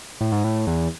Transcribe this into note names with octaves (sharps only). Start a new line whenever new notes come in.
A2
G#2
A2
E2